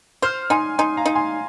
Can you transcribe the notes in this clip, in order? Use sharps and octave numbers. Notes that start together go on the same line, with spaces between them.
C5 C6 F6
D#4 G#5 C6
D#4 G#5 C6
F5 A#5
D#4
G#5 C6